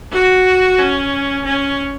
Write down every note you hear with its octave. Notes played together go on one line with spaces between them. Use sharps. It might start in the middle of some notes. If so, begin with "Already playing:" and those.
F#4
C#4
C#4